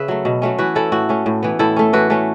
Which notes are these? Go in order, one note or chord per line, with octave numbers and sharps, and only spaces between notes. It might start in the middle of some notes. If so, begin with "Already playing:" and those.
Already playing: C#3 B4 E5
F#3 A3
B2
F#3 A3 C#4
E3 F#4 B4
C#4 E4 A4
A2 F#4
A3 C#4
A2
E3 B3
A2 E4 A4
A3 C#4
E3 F#4 B4
A3 C#4